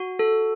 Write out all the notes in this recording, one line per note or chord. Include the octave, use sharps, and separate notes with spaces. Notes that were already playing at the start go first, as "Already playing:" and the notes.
Already playing: F#4
A4